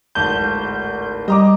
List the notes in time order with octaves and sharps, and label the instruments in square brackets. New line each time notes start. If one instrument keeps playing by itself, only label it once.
[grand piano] D1 G#1 A5 [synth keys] G6
[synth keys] G3 [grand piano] D#5 A#5 D6